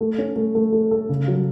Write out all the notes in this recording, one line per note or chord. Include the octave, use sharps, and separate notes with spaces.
A3
C#4
A3
A3
A3
A4
C#3
F#3